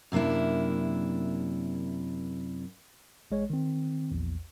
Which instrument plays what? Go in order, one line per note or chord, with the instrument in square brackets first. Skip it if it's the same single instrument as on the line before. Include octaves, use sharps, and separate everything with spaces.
[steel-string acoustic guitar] F#2 C3 A#3 D4 E4
[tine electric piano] A1 G#3 C#5
D#3 C4
A#1 E2